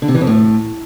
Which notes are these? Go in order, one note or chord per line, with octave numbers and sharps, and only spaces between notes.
D3
C3
E3
F2
A2